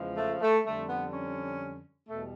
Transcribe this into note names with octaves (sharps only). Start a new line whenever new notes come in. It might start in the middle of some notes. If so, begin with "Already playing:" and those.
Already playing: E2 C#3 F3 G#3
A3
A3
F2 D3 G3 A3
B3
C#4
E2 B2 G3 A3